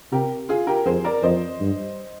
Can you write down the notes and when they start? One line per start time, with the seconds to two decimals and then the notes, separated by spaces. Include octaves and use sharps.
0.12 C3 G4 A#4
0.49 F4 G#4
0.67 G4 A#4
0.85 F2 G#4 C5
1.04 A#4 D5
1.23 F2 C5 D#5
1.60 G2